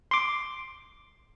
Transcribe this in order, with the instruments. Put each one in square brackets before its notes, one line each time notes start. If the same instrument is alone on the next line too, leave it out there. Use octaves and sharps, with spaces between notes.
[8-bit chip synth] C6 D6